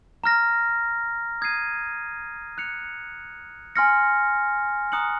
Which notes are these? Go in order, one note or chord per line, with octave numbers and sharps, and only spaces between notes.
A#5 F6 A#6
D#6 G#6 C7 D#7
F#6 C#7 F7
G#5 C6 F6 A#6 C#7
A#5 D#6 F#6 C#7 F#7